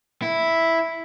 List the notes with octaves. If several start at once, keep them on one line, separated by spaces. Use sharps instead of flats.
E4